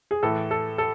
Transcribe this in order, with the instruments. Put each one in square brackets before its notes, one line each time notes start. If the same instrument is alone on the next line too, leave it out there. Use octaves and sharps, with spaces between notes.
[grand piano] G#4
A2 E3 A4
A4
A4